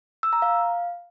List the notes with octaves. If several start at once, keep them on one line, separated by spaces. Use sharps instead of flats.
E6
A#5
F5